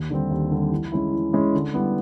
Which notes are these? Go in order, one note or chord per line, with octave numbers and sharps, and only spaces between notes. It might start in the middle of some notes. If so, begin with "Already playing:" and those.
Already playing: D#2
D3 G3 C4
D#2
D3 G3 C4
E3
G#3 C#4 E4
E3
G#3 C#4 E4
D3
G3 B3 E4